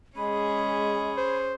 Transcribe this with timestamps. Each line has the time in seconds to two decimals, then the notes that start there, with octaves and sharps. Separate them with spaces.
0.17 G#3 C#4 G#4 B5
1.18 C5